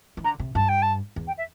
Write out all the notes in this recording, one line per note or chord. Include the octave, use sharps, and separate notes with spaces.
E3
D3 A#5
C3
G2 A5
G5
A5
E2
G5
E5